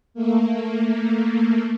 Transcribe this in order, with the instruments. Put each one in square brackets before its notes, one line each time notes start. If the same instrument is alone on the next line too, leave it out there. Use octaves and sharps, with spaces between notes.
[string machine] A3 A#3